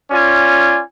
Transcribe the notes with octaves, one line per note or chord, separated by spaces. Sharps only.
C#4 F4 D5 G#5